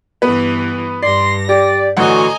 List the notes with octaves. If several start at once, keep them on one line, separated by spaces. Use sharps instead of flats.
G2 E3 B3 B4
G2 D5 C6 A#6
G4 D5
A1 D3 E3 F#4 D#5 F#5 G#5 A#5